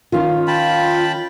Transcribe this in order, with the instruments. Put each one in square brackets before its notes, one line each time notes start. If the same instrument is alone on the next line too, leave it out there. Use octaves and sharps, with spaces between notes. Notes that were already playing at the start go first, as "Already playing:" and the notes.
[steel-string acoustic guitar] D#3 C#4 [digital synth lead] F4
[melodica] G5 A5 B5